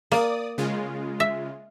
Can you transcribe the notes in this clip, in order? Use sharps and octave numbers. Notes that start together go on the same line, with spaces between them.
A#3 D5 D#6
C#3 G#3 F4
E5